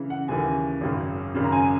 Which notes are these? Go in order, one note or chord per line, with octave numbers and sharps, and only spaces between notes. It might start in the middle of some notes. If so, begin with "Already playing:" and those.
Already playing: C#3 E3
F#5
D#2 C#3 E3 G#5
G#1 F#2 C#3
G#1 F#2 C#3
A#5
G#5